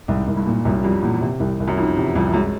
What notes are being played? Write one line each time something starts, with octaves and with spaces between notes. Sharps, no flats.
C2 G#2
C2
G2
A#2
C2 F#2
F2 G3
E2 A#2
C3
C2
C2
F#2
F2 D#3
E2 C3
C2 F2
F#2 G#3